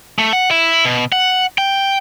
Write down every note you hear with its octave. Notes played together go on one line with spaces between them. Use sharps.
A3
F#5
E4
B2
F#5
G5